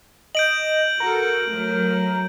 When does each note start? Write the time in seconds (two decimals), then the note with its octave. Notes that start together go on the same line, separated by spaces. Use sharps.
0.35 D#5 G6 D7 F#7
1.00 F#4 A4 A#4
1.51 F#3 A3